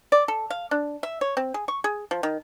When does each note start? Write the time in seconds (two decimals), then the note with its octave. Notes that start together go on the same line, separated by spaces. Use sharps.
0.12 D5
0.28 A4
0.50 F5
0.71 D4
1.03 E5
1.21 C#5
1.37 C4
1.54 G#4
1.68 C#6
1.84 G#4
2.11 F3
2.23 D#3